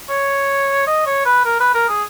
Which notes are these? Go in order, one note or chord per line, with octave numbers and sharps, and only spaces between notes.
C#5
D#5
C#5
B4
A#4
B4
A#4
G#4